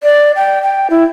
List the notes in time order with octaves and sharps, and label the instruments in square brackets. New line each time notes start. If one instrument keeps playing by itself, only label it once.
[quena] D5
G5
G5
E4